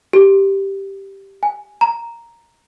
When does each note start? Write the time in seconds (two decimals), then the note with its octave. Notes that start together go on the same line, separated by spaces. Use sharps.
0.13 G4
1.43 G#5
1.81 A#5